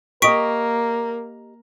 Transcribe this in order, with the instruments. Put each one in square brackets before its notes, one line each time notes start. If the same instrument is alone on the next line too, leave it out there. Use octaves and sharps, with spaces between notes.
[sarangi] A#3 [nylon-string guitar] G4 D#5 [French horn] A#4 [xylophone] C#6 B6 D7